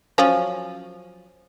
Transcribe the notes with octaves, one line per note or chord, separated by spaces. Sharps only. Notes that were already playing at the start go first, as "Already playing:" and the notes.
F3 F#3 C#4